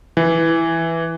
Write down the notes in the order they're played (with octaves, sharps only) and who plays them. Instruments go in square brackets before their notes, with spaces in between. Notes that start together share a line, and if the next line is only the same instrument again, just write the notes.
[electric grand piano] E3